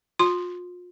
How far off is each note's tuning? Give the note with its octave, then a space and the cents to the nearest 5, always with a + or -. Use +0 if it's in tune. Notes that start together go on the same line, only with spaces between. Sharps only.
F4 +35 C6 +0